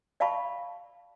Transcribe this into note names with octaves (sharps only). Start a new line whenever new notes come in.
D5 F5 G5 A5 B5 C#6